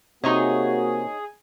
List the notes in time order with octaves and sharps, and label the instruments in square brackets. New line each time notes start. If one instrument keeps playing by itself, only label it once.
[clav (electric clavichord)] C3 [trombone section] A#3 F#4 [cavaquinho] D#4 C#5 D#5 [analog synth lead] G#4